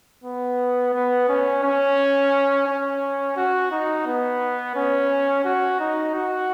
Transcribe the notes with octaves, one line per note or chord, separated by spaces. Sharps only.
B3
B3
C#4
C#4
C#4
F#4
D#4
B3
C#4
F#4
D#4
F#4